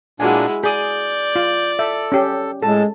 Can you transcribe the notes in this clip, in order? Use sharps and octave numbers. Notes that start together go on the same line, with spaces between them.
A#2 G#3 A#3 D4 E4 F#4 G#5
G#4 D5 D#6 G6
F4
A4 E5
C#4 G4
A2 G#3 A4 A5